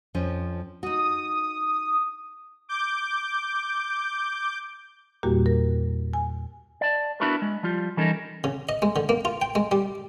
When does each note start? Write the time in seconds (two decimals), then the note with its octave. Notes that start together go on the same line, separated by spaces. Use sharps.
0.15 F2 F3 C#4
0.83 D#4 F#4 D#6
2.69 D6 G6
5.23 E2 A#2 G3 A#3 F#4 G4
5.46 A#4
6.13 G#5
6.81 D5 A5
7.20 B3 D4 E4 F#4 A#4 B4
7.42 G#3
7.63 F3 G3 F4
7.97 E3 G3 C#4 D#4 A4 A#4
8.44 C#3
8.69 D#5
8.82 G#3
8.96 D3
9.09 A#3
9.25 F4
9.42 G5
9.55 G#3
9.71 G3